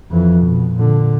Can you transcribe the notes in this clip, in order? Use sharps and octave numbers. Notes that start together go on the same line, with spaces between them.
F2 E3
B2
A#2 D3